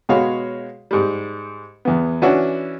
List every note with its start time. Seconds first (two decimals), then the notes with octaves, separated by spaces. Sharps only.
0.09 B2 G#3 F#4 C#5 F5 B5
0.91 G#2 G3
1.85 E2 B3
2.22 E3 C#4 D4 E4 F#4